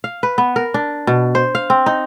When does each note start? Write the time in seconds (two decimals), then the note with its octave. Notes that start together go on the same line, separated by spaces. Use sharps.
0.04 F5
0.23 B4
0.38 B3
0.56 A#4
0.74 D4
1.07 B2
1.35 C5
1.55 F5
1.70 C4
1.86 D#4